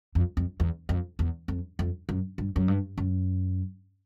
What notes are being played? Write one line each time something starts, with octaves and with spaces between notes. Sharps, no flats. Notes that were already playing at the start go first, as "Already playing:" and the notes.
F2
F2
E2
F2
E2
F2
F2
F#2
G2
F#2
G2
F#2